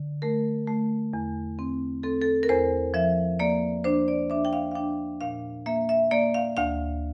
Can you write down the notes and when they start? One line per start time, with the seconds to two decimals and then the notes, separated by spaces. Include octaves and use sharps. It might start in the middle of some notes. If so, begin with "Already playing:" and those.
Already playing: D3
0.22 A3 A#4
0.67 A3
1.13 E2
1.59 C4
2.03 C4 A4
2.22 A4
2.43 A#4
2.49 E2 C5
2.94 F3 E5
3.39 A#3 D5
3.84 D4 C5
4.08 D5
4.30 D4 E5
4.45 G5
4.53 F5
4.71 F5
4.75 D4 G5
5.21 A#2 F5
5.66 A#3 E5
5.89 E5
6.11 A#3 D5
6.34 F5
6.57 D2 F5